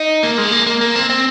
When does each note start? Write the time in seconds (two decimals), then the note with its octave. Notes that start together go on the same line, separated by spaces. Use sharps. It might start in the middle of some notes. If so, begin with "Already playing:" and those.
Already playing: D#4
0.23 A#3
0.38 G#3
0.52 A#3
0.66 A#3
0.81 A#3
0.96 C4
1.10 C4